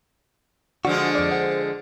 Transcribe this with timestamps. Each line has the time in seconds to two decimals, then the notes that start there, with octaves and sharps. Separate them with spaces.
0.85 D3 F3 G#3 F#4
1.15 F2 D5
1.31 C5 F#5